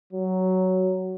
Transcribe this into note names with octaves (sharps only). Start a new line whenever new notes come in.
F#3